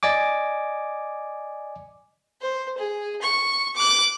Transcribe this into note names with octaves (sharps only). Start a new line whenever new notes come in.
D5 D#5 G#5 D6
C5
G#4
C#6
D6 F#6